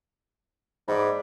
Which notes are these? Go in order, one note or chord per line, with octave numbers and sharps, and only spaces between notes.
G#2 D5 B5